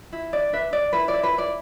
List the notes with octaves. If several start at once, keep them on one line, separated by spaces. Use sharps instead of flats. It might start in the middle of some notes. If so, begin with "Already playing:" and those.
E4
D4 D5
D4 B4 E5
D4 D5
E4 B4
E4 D5
B4
E4
D5